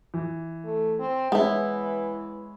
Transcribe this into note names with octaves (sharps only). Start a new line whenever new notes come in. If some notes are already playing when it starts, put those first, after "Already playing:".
E3
A3
C4
E3 G#3 B3 C#4 E4